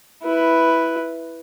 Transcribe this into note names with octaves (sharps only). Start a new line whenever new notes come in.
E4 B4